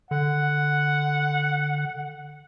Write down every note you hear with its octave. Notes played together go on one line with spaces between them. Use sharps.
D3 F#5